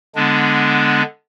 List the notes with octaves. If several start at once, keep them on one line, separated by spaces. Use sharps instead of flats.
D3 G#3 B3 D4